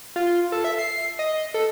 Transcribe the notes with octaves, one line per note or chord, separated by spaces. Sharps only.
F4
A4
E5
C7
D#5
A4